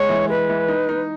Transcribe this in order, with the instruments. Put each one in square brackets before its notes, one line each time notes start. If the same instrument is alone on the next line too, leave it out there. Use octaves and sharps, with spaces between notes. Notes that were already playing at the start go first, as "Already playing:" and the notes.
Already playing: [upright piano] G#3 [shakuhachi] C#5
[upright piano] E3
[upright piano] G#3 [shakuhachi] B4
[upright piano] E3
D#4
D#4